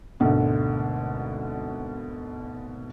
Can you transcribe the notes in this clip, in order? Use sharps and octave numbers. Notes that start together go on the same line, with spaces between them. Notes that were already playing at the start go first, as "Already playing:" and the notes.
G#1 D2 B2 D3